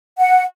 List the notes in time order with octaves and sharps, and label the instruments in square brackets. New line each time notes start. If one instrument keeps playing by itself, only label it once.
[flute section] F#5